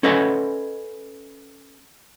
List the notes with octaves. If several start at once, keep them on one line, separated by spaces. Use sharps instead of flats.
C#4 A4 B4 D#5 F#5 G#5